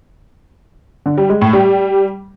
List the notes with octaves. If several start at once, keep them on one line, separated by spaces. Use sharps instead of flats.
D3
G3
G#3
A2
G3